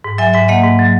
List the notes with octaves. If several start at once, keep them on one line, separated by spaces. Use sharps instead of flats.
G#2
F#3 E5 G#5
G#2 E5 G#5
A#3 D#5 F#5
G#2
F#3